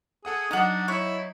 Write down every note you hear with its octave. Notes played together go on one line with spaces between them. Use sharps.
G#4 A4 F#5 D#6
F#3 D4 D#4 F#5 A#5 D#6
E4 C#5